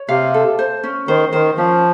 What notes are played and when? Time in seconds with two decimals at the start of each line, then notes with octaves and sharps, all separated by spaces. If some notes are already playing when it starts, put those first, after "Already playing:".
Already playing: C#5
0.09 C3 F5
0.34 A4
0.59 C5
0.84 C#4
1.08 D#3 C5
1.33 D#3 C5
1.57 F3 C#4